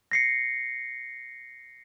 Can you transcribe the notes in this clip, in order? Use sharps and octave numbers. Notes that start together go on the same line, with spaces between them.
A#6 C7 C#7